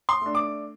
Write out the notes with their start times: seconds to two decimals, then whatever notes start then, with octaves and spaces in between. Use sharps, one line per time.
0.09 C6
0.21 A3 D4
0.35 D6